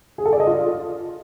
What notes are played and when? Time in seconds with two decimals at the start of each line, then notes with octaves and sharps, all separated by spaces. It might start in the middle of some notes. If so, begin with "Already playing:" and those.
0.18 G#4
0.25 A4
0.33 D5
0.40 D#5
0.47 F4